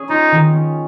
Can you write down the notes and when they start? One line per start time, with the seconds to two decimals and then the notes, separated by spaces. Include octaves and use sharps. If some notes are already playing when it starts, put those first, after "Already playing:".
Already playing: C#4 G#4
0.09 D#4 F4
0.32 D#3
0.53 C#4